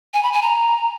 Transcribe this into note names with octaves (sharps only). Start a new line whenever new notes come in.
G#5
B5
G#5
A#5